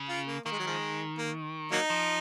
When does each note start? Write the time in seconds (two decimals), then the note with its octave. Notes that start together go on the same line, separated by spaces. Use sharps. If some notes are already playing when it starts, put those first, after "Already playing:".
Already playing: C#3
0.09 F4
0.27 A#3
0.45 D#3 A#3
0.52 G#3
0.59 F#3
0.67 F3 G#3
1.18 A#3
1.72 F#3 A#3 D#4
1.90 F3